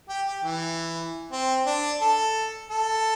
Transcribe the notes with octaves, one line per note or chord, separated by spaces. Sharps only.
G4
G4
E3
C4
D4
A4
A4